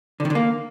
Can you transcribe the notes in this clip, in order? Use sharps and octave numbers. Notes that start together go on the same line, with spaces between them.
D3
D#3
D3
A#3